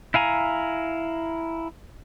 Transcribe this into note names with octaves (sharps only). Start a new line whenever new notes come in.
E4 F5 G#5 A#5